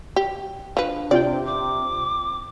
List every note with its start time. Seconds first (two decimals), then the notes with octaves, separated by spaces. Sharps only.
0.16 G4
0.77 F3 D4 B4
1.11 C3 C4 F4 D5 G5
1.46 D6